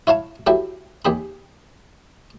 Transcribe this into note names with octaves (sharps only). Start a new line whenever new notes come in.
E4 C#5 F5 A5
F#3 E4 G4 A4
D#2 G4 G#4 B5